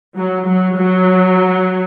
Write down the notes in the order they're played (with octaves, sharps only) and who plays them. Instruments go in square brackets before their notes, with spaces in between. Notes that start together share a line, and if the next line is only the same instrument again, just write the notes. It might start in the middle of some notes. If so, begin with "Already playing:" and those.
[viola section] F#3
F#3
F#3